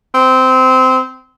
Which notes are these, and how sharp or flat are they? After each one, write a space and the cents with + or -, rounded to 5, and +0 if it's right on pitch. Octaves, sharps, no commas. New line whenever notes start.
C4 -15